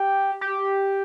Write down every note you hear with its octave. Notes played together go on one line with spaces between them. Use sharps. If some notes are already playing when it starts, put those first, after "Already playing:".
Already playing: G4
G4